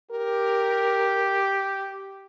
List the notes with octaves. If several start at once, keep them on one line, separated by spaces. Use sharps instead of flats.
G4 A#4